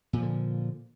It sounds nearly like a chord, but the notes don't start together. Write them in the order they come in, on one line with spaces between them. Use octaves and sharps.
A#2 F3 D3